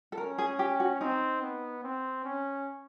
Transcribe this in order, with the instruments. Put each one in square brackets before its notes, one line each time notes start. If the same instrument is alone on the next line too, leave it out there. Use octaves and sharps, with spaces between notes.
[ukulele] A4
[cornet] C#4 [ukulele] A#4
[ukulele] G#4
G4
F#4
[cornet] C4 [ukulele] D#4
[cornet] B3
C4
C#4